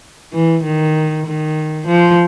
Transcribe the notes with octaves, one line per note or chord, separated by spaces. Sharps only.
E3
D#3
D#3
F3